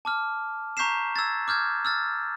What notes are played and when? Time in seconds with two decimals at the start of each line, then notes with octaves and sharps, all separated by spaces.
0.05 A5 D6 F6
0.77 A#5 C#6 G6 B6 C7 E7
1.16 E6 G#6 A6
1.48 D6 F6 G6 G#6
1.85 E6 F6 A6